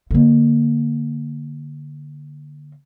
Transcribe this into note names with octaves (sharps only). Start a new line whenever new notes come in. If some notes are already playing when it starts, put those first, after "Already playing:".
D3 A#3